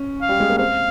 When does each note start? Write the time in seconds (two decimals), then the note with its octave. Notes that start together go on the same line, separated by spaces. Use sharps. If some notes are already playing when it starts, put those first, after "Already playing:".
Already playing: C#4
0.22 F5
0.29 G3
0.40 G#3
0.50 A#3
0.58 C4 F5